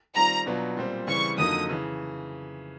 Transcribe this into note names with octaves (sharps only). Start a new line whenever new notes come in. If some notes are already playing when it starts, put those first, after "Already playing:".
D#3 G3 C4 F4 A#5
B2 F#3 B3 D4 F4
A#2 G3 C4
C#3 E3 G3 C4 C#6
F2 D3 F#3 A#3 D#4 D#6
C#3 E3